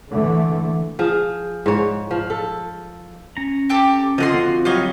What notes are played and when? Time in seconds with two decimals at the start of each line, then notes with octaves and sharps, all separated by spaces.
0.11 D3 E3 A3
0.99 F3 G#4
1.66 G#2 C#5
2.11 F3
2.30 A4
3.37 C#4 A#5
3.69 C4 G4 A4
4.18 D3 F3 D#5 F#5 C6
4.34 C4 F#4
4.65 F#3 G3 F4 C#5 D#5